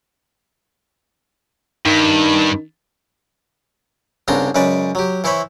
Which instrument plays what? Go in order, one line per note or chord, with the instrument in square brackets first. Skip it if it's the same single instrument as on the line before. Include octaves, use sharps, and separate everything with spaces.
[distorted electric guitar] G2 [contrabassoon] D#3
[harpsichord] C2 C#3 B3 D4 A#5 C6
F#2 C#3 G#3 B4 D5
F#3 G4
E3 E4 C5 C#5 B5